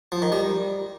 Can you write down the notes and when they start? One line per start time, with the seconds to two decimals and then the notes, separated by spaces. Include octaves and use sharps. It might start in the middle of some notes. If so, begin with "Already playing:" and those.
0.12 F3
0.22 D#3
0.32 G3